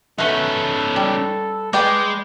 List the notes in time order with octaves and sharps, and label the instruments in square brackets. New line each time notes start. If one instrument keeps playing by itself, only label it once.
[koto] A3 F#4 [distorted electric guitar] C#4 D#4 [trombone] A4 [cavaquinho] B4
[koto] G3
[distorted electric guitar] G#3 [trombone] B4 [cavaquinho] D5 G5 A5